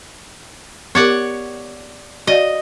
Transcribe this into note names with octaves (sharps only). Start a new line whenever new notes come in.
B3 G4 A#4 C#5 D5 F#5
F#4 D5 D#5 F5